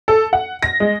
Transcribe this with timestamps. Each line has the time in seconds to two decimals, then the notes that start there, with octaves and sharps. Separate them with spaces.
0.08 A4
0.33 F#5
0.62 A#6
0.80 G#3